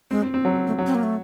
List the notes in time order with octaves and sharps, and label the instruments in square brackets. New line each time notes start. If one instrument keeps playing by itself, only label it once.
[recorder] G#3 [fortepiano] C4
[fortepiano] C4
C4
F#3
[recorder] A3
[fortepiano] F#3
[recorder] C4
A#3
A3